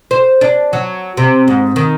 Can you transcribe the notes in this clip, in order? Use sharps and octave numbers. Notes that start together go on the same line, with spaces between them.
C5
D4
F#3
C3
G#2
D#3